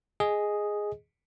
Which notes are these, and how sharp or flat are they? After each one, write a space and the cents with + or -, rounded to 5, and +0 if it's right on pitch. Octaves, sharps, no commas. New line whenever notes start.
G#4 +0 D#5 +0